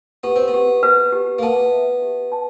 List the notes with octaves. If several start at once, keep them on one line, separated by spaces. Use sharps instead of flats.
B3 G4
C4
B3
G4
B4
G4
A#3
B3 A5
E5
G4
A5